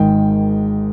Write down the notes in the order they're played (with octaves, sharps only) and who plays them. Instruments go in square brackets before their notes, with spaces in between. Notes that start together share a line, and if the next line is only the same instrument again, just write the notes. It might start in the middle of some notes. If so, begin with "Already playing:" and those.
Already playing: [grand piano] G#1 G#2 D#3 G5